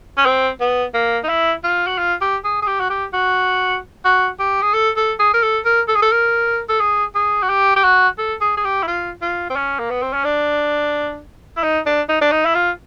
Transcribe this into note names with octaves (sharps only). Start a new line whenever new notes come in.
C#4
C4
B3
A#3
D#4
E4
F4
F#4
F4
G4
G#4
G#4
G4
F#4
G4
F#4
F#4
G4
G#4
A4
A4
G#4
A#4
A4
A#4
A4
G#4
A4
A#4
A4
G#4
G#4
F#4
G4
G4
F#4
A4
G#4
G#4
G4
E4
F4
F4
C4
C#4
A#3
B3
C4
C#4
D4
E4
D#4
D4
D#4
D4
D#4
E4
F4